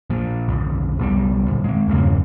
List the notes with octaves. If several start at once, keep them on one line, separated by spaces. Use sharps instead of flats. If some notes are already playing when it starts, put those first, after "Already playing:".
A#2 F3
B1 F2
C2 B2 E3 G3
F2 A#2
G#3 C4
E2 G2 C#3 A#3